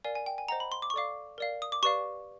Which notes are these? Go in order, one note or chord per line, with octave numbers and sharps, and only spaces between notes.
A#4 D5 F5 G#5
G#5
G5
G#5
C5 D#5 F#5 A#5
B5
C6
D6
C#6
A4 D5 F5 D6
A#4 D5 F5
D#6
D6
G4 B4 D5 F5 C#6